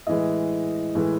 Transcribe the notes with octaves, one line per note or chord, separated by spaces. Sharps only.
A2 E3 G#3 D#5
A2 E3 G#3